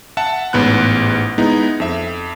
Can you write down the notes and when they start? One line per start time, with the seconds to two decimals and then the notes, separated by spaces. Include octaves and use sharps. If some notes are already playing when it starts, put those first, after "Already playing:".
0.17 E5 F#5 A5
0.53 A1 G#2 B3 B5 F#6
1.38 G#3 B3 D#4 E4
1.80 F2 E5